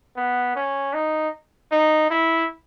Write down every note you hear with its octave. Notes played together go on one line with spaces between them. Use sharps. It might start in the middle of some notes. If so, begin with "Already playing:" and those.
B3
C#4
D#4
D#4
E4